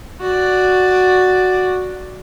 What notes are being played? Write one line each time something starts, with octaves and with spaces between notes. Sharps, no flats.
F#4 D5